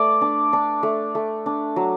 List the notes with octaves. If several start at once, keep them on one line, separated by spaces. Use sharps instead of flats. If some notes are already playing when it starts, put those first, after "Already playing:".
Already playing: A3 D5
D4
D4
A3
A3
D4
F#3